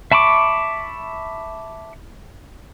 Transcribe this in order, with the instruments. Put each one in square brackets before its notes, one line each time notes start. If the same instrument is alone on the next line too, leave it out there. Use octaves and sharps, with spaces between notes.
[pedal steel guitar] E5 A5 B5 C#6 D6